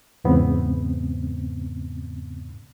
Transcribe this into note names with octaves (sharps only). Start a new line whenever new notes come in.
E2 G#2 C#3 B3 C4